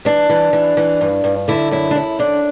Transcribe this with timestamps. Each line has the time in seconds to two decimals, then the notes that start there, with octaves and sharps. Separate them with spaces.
0.05 E3 D4
0.29 E3
0.53 E3
0.77 E3
1.01 G2
1.24 G2
1.48 D3 E4
1.71 F#2 E4
1.91 D4
1.95 F#2 E4
2.19 D3 D4